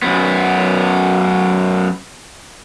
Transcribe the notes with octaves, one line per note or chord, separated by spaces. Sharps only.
F#2 B3